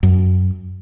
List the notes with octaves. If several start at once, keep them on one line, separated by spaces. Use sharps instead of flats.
F#2